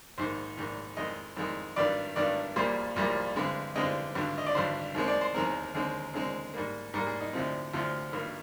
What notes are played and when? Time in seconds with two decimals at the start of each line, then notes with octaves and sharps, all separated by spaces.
0.18 A#1 G#2 D#3 C5
0.57 A#1 G#2 D#3
0.97 F2 D#3 G#3 D#5
1.37 F2 D#3 G#3
1.76 G#1 G2 D#3 D5
2.16 G#1 G2 D#3 D5
2.56 A#1 A#2 G3 A#3 C5
2.96 A#1 A#2 G3 A#3
3.36 G2 D3 G#3 C4
3.76 G2 D3 G#3 C4 D#5
4.15 G#1 G2 D3
4.38 D#5
4.46 D5
4.55 G#1 G2 D3 C5
4.95 D#2 D#3 G#3 C4
5.08 D5
5.21 C5
5.34 D#2 D#3 G#3 C4 A#4
5.75 D#2 D3 G#3 C4
6.14 D#2 D3 G#3 C4
6.54 G#2 G3 A#3
6.94 G#2 G3 A#3 A#4
7.07 G#4
7.20 D#4
7.33 D2 C3 F3 C4
7.73 D2 C3 F3 C4 F4
8.13 G#1 G2 D#3 A#3